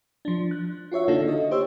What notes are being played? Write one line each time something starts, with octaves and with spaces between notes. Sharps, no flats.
F3 D4
F#6
F4 F#4 C#5 E5
D3 A#3 D4 D#4 F4 A4
D#5
G4 C5 C#5 E6